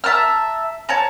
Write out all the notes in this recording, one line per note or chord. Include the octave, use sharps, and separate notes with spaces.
E5 A5 A#5 F6
C#5 A5 A#5